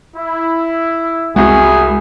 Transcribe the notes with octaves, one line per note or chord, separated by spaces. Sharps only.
E4
C2 G#3 F#4 G#4